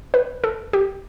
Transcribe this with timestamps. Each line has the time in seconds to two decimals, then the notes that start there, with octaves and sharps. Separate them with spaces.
0.14 B4
0.44 A4
0.73 G4